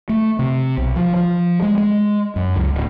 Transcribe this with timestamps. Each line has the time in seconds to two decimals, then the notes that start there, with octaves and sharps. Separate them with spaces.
0.09 A3
0.39 C3
0.78 B1
0.96 F3
1.16 F3
1.62 G#3
1.78 G#3
2.36 F#2
2.56 C#2
2.74 D1